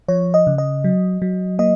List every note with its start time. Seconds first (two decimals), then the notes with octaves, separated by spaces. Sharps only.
0.08 F3 C#5
0.34 D#5
0.47 C#3
0.58 D#5
0.84 F#3
1.22 F#3
1.59 A#3 D#5